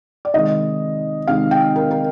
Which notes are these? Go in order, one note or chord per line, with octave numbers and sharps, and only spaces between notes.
D5
C3 D#3 G#3 D#4 D#5
C3 D#3 G#3 D#4 F5
G5
A#4
A#4